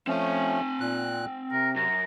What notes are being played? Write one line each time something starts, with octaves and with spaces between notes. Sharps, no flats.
F3 A3 C4 C#4 G#5
A#2 F#6
C3 A#4
F#2 A#5